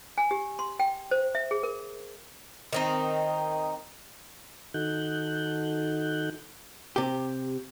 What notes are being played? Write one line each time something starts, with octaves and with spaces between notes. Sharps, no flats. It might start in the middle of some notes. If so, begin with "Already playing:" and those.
G#5
G4
C6
G5
C5
E5
G#4
A#4
D#3 C4 D#4
D#3 D#4 F#4 A4 F#6 G6
C3 G4